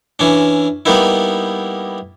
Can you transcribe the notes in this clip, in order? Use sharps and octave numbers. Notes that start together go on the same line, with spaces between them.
E3 C#4 D4
G3 A#3 B3 D#4 E4